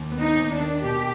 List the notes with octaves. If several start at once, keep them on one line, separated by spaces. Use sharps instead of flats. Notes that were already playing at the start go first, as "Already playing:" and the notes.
Already playing: D#2
B3
D#4
D#2
D4
D#3
B2 G4